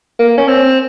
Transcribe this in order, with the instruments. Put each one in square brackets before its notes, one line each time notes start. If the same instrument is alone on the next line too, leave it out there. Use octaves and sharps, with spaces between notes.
[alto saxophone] A#3
C#4
C4